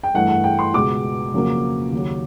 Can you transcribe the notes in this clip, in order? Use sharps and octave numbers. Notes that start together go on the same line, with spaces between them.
G5
G2 E3 A3 F#5
F#5
G5
C6
C#2 B2 G#3 D6
F2 C#3 F#3 A#3 C#4
D#2 C#3 F#3